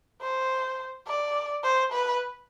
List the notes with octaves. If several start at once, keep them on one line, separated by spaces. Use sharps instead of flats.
C5
D5
C5
B4